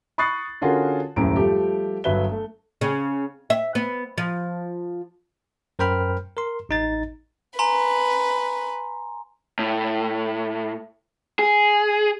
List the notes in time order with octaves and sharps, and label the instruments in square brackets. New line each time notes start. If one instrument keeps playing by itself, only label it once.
[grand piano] B5 C#6 D#6 F#6 A6 C7
D3 C#4 F4 F#4 G#4 A#4
D#1 F#2 A2 A#5 D7
F3 G3 A3 G4
G1 F#3 B4 E5 G7
A3
[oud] C#3
E5
B3
F3
[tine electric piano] F#2 A#4 C5 G5 B5 F6
A#4 C6
A1 D#4 A6
[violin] B4 [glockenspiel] G#5 A#5 C6
[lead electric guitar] A2
G#4